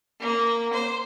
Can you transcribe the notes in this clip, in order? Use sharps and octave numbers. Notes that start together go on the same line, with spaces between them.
A#3
C5